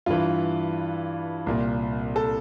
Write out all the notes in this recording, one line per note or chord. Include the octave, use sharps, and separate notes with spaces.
G2 E3 F4
C2 A#2
A4